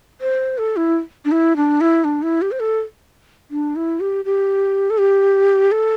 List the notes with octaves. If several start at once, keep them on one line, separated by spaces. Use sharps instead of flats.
C5
A4
E4
D4
E4
D4
E4
D4
E4
G4
C5
A4
D4
E4
G4
G4
A4
G4
A4